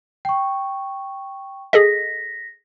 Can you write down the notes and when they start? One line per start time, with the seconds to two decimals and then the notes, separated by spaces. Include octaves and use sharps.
0.25 G5 C#6
1.73 G#4 A4 D#5 A#6 B6